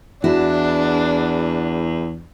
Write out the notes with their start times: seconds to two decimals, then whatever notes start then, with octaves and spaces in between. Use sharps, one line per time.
0.24 E2 D4 E4 F#4